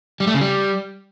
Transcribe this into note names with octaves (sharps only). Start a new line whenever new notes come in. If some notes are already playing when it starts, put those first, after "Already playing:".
G3
A3
C#3
G3